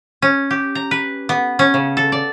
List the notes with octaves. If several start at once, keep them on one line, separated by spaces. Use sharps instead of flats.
C#4
G4
A#5
B4
B3
C#4
C#3
A4
D5